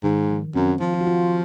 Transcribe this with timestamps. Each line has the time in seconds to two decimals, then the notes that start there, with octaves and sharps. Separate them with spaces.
0.03 G#2 D#3
0.29 F3
0.55 F#2 C4
0.68 C4
0.81 F3 F4
0.94 F4
1.01 F#4
1.07 F4